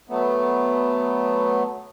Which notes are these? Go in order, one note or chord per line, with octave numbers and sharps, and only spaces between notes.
F#3 A3 B3